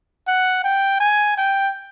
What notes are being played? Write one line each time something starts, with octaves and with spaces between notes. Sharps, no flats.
F#5
G5
G#5
G5